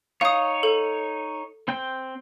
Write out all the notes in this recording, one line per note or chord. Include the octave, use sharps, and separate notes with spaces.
D#4 C#5 F5 D#6
A4
C4 G5